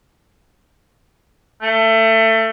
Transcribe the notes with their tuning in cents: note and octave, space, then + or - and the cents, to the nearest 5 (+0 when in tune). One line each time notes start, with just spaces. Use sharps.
A3 +25